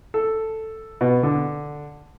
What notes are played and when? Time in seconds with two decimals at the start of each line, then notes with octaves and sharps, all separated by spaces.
0.14 A4
1.01 B2
1.23 D3